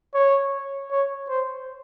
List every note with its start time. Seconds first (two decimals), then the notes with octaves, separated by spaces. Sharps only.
0.14 C#5
0.91 C#5
1.29 C5